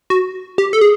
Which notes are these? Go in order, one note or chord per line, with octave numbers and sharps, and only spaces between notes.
F#4
G4
A4
G#4